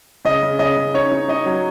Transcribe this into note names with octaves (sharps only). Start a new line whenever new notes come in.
C#3 D#5
C#3
C#3 D#5
C#3
D#4 C#5
D#4
D#4 D#5
F#3